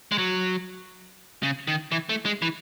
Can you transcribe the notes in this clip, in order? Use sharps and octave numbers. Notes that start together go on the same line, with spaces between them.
G#3
F#3
C#3
D#3
E3
A3
G#3
E3